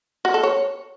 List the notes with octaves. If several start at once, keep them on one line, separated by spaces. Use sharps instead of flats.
F#4
A4
C#5